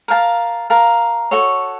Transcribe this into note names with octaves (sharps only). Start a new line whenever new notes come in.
A#4 F5 A5
A#4 F5 A5
F#4 A4 C#5